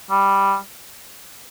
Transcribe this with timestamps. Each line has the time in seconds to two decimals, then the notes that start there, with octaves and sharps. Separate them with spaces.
0.10 G3